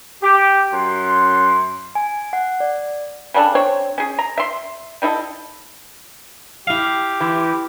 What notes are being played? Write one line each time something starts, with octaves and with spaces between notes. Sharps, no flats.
G4
F#2 C6
G#5
F#5
D5
C#3 G3 D4 A4
C4 D4 C#5
C#4 G#4
A#5
E5 C6
G3 D#4 E4 A4
E4 G4 F5
E3